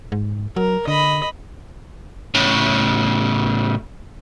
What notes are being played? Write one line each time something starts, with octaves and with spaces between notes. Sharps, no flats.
G#2
F#3 A#4
D3 D#5 B5
A2 C#3